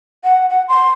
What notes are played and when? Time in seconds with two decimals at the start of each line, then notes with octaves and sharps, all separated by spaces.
0.24 F#5
0.50 F#5
0.68 C6